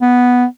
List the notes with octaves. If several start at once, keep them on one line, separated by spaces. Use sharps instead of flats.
B3